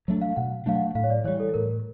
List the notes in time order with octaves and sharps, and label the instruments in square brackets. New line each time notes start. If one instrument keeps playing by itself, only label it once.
[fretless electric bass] F#3 A3 D4
[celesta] F5
[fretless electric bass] B2 [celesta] F#5
[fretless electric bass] F#3 A3 D4 [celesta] F5
[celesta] F#5
[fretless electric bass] A2 [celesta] F5
[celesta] C#5
D5
[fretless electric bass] E3 G3 [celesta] C#5
[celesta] A4
[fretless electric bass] A2 [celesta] A#4